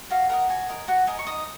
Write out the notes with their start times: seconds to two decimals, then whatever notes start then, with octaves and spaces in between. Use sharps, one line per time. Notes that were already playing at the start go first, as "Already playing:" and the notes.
0.10 F#4 F5
0.29 A#4 D#5 F#5
0.49 F#4 G#5
0.69 A#4 D#5
0.88 F#4 F#5
1.07 A#4 D#5 G#5
1.19 C#6
1.27 D#4 D#6